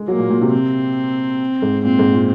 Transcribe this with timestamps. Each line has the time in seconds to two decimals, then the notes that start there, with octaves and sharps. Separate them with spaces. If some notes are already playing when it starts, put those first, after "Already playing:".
Already playing: G#3
0.08 F#3 A#3
0.19 A#2
0.30 A#2
0.42 C3
0.52 C4
1.62 G#2
1.84 A#2 C4
1.99 G#2
2.14 A#2